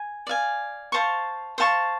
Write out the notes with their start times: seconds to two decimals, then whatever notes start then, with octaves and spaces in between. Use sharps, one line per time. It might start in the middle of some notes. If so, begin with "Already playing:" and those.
Already playing: G#5
0.27 D5 F5 G#5
0.92 C5 F5 A5 C#6
1.58 C5 F5 A5 C#6